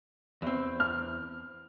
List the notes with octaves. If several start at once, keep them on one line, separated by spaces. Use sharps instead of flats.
E2 C4
F6